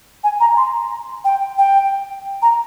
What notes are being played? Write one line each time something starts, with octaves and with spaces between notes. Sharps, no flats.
G#5
A#5
C6
G5
G5
A#5